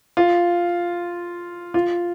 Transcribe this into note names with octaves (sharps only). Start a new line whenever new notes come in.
F4
F4